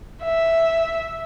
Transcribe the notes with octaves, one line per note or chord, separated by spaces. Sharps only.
E5